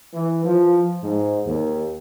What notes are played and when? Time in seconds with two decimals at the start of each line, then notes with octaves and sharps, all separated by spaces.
0.14 E3
0.45 F3
1.03 G#2
1.46 D#2